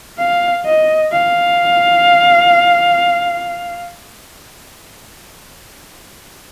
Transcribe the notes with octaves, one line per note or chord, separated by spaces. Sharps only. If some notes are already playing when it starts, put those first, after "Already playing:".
F5
D#5
F5